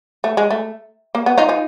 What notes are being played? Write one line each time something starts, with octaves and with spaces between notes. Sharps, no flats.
A3
G#3
A3
A#3
B3
D#4 F4
D#4 F4